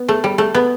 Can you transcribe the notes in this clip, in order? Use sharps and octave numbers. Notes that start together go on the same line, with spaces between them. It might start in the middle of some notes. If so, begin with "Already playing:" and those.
Already playing: B3
A3
G3
A3
B3